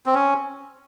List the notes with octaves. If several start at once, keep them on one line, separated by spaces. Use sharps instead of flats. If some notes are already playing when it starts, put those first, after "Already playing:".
C4
C#4